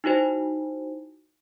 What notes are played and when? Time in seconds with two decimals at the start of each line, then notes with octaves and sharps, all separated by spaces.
0.04 D#4 E4 F#4 C5